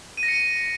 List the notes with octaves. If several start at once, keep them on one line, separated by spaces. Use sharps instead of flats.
D#7
A#6
C#7
D#7